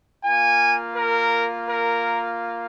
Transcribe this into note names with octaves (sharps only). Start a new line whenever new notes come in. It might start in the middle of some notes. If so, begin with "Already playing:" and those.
A#3 F4 G#5
A#4
A#4